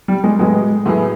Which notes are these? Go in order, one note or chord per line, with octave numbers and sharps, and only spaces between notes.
G3
G#3
A1 A2 F#3 G#3 B3
A2 F#3 B3 E4 G#4